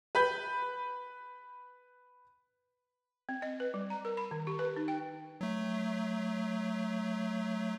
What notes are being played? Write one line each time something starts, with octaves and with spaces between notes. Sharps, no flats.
B4 B5 G6
C4
D#5
B4
G3
A#5
A#4
B5
D#3
G4
B4
D#4
G5
F#3 A3